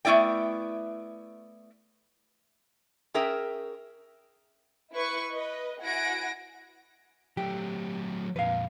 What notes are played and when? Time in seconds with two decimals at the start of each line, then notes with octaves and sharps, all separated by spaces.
0.05 A3 B3 E4 D5 G5
3.14 C#4 G#4 A#4 E5 G5
4.93 E4 B4 C#6
5.33 B4 D#5
5.80 E4 F#4 F#5 G#5 A#6 D7
7.37 F#3 A3 G4
8.36 F2 A#2 B4 F5